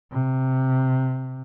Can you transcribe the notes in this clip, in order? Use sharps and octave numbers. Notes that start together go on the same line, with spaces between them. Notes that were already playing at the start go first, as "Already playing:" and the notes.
C3